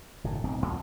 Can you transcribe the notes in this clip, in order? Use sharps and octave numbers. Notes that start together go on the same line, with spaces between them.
F#1 A2 D#3
D1 B1 B2 C4
C2 F2 B2